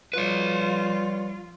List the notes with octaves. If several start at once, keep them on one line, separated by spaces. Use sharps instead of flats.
F3 G3 F4 B4 C#5